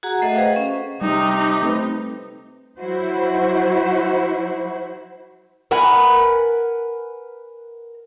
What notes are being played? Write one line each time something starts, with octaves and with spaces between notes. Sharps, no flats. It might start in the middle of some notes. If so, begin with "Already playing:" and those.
F#4 G#4 F#5 A#5
A3 A4 D#5 E5 F#5
G#4 B4 C5 D#5 F5 G5
C#4
C3 G3 D#4 G4
A3 C4 B4
F#3 E4 F#4 C5
A#4 B4 F#5 G#5